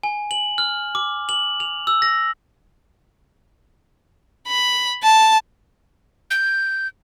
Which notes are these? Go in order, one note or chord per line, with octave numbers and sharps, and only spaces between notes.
G#5
F#7
F6
D6
F#7
F7
E6
A#6
B5
A5
G6